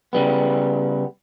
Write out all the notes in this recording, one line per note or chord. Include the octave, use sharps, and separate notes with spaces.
C#3 G3 B3